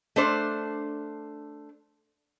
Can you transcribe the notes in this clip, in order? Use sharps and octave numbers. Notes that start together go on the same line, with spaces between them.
A3 D4 C5